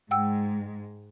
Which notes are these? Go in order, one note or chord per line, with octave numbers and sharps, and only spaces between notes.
G#2 G#3 F#5 G5 E6